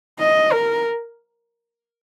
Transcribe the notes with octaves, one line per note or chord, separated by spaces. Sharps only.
D#5
A#4